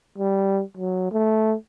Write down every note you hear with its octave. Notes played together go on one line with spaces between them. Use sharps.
G3
F#3
A3